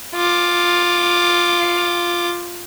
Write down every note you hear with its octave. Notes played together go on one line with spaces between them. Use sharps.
F4 D6